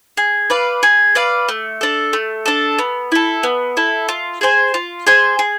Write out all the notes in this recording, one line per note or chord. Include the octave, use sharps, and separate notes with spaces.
G#4
B4 D5 F5
G#4
B4 D5 F5
A3
D4 A4
A3
D4 A4
B3
E4 A4
B3
E4 A4
F4
G#4 C5 G#5
F4
G#4 C5 G#5
G#4